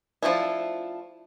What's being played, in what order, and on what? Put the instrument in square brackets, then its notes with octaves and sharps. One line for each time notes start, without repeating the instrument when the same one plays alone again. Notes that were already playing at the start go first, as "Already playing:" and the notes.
[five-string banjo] F3 F#3 A3 D4 E4